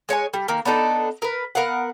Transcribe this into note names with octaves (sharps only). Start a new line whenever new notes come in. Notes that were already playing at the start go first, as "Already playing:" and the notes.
G#3 C#5 F5 G#5
G3
D#3 A#3
B3 D4 D#4 A4
A#4 B4
B3 A#4 F5 F#5